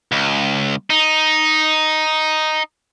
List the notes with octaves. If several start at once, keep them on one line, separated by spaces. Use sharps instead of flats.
C#2
D#4